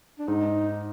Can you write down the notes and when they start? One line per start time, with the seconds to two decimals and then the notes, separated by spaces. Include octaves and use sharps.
0.19 D4
0.28 G#2 D#4